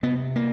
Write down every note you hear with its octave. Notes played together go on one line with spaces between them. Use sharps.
C3 B3
A#3